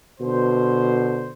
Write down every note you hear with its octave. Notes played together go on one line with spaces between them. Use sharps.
B2 D3 C5